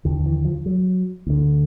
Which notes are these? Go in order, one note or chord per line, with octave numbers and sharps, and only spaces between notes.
D#2 D3 D#3
E3
F3
F#3
D2 D3